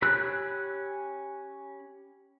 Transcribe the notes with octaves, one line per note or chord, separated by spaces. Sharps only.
C#4 G4 B5 E6 F#6